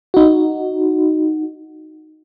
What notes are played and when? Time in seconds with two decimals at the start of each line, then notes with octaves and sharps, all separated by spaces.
0.14 D#4 F#4